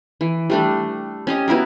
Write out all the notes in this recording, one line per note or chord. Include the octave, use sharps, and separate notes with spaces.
E3
G3 A3 D4
C#4 G4 D#5
B3 E4 F#4 A#4